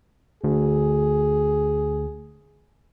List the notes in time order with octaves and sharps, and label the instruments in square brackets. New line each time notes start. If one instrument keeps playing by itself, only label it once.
[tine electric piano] D2 [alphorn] G#4